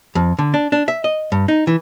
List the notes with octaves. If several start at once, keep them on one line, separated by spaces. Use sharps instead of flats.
F2
D3
D4
D4
E5
D#5
G2
D#4
E3